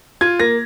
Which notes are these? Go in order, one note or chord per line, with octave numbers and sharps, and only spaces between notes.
F4 G#6
A#3 A#6